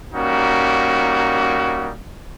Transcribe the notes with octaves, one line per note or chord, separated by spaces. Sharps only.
G3 A#3 C#4 D#4 F#4